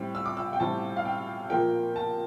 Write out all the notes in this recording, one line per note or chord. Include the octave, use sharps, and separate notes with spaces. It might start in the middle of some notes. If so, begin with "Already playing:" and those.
Already playing: A2 G3 C4
E6
D6
E6
G5
A2 G3 C4 A5
F5
G5
A#2 F3 A#3 G5
A5